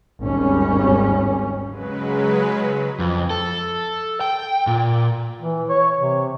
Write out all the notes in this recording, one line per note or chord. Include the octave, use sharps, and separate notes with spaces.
G#1 D#2 G3 C#4
C#3 F#3 G#3 B4
F2
A4
G5
A#2
E3
C#5
C3